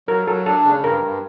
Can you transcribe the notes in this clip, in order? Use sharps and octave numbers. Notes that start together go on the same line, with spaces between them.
F#3 A#4
F#3 A4
D4 A4
C#3
G2 A#4
G2